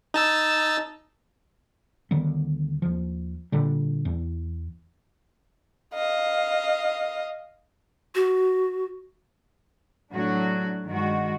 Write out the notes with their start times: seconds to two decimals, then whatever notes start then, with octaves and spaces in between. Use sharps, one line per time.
0.14 D#4 A5 E6
2.11 D2 D#3 G3 B3
2.82 D#2 F3
3.52 A#2 D3 G3
4.05 E2
5.94 D#5 F5
8.15 F#4
10.12 A2 F#3 D4 F#4
10.85 G2 D#3 G#3 F#4